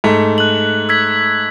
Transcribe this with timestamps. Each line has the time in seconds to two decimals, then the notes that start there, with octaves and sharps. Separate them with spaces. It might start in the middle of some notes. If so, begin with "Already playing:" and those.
0.04 G#2 A3
0.38 F#6 F#7
0.89 E6 G#6 B6